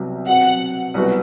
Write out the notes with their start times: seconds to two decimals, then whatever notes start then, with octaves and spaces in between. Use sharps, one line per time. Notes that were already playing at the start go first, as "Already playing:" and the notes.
Already playing: C2 C3 F#3 B3
0.28 B2 F#3 C4 F#5
0.94 C2 B2 F#3 B3 F#4